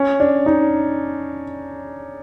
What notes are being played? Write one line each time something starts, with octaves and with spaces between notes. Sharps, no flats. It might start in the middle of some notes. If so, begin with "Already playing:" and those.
Already playing: C#4
D4
D#4